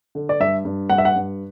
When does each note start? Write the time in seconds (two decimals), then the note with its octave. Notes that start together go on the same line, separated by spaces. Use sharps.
0.15 D3
0.29 D5
0.40 G2 E5
0.65 G2
0.90 G2 F#5
0.98 E5
1.05 F#5
1.16 G2